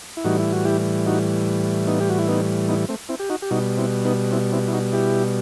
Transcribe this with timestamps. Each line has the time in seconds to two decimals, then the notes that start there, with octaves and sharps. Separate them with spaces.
0.17 E4
0.24 A2 E3 G3 D#4 F#4
0.39 E4
0.52 F#4
0.65 E4 G4
1.06 D#4 F#4
1.87 B3 D#4
2.00 G4
2.10 F#4
2.19 E4
2.28 B3 D#4
2.69 B3 D#4
2.89 A3 C4
3.09 C4 E4
3.19 G4
3.30 D#4 F#4
3.42 G4
3.51 B2 G3 D#4 F#4
3.78 C4 E4
4.05 B3 D#4
4.31 C4 E4
4.52 C4 E4
4.68 E4
4.73 D#4 F#4
4.93 E4 G4